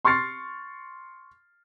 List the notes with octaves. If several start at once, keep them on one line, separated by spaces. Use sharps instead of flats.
C6 C#6 F6 A6 C7